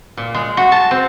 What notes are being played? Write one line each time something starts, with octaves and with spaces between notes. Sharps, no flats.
A#2
G#3
F#4
A5
C4